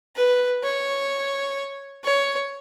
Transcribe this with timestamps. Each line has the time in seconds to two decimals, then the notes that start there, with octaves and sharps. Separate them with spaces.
0.16 B4
0.63 C#5
2.04 C#5